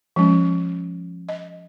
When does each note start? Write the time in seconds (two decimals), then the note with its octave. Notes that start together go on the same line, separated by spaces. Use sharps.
0.16 F3 G#3 C#4
1.29 D#5